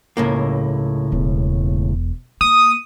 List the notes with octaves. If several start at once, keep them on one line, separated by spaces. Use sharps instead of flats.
C#2 A2 A#3
E1 E2
A#3 D#6